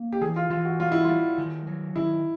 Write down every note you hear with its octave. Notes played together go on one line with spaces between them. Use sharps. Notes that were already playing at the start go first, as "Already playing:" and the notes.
Already playing: A#3
G4
E3 G#4
F4
E3 F4
F#4
G3 F4
E4
G3 F4
D#3
F#3
D#3 E4